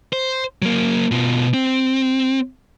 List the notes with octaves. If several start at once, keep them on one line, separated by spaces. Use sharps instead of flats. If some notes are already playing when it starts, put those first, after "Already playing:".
C5
F#3 A#3
B2 F4
C4